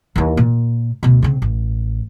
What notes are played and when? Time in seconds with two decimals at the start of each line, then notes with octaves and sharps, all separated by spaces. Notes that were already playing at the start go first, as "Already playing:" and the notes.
0.16 D#2 E3
0.37 A#2
1.03 D2 B2
1.22 C#3 C4
1.42 A1